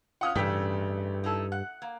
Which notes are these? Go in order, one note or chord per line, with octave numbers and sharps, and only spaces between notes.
C#4 F4 F#5 D#6 F6
A1 G2 C#3 A3 G4 B6
D#4 E4 A4
F#5 F#6
A#3